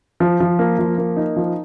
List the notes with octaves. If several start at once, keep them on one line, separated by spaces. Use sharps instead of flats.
F3
F3
A#3
F3
A#3
D#4
F3